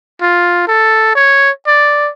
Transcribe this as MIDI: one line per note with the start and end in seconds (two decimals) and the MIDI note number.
0.22 0.66 65
0.68 1.15 69
1.16 1.51 73
1.67 2.11 74